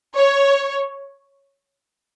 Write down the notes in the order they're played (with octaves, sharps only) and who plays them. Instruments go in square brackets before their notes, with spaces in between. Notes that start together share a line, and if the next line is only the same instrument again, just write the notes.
[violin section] C#5